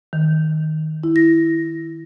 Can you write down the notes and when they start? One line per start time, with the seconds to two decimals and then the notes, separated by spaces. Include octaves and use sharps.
0.13 D#3
1.03 E4
1.16 A#6